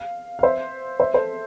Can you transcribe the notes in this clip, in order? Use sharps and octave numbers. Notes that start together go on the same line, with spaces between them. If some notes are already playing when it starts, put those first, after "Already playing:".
Already playing: F5
F5
C5 E5
C5 E5
A4 C5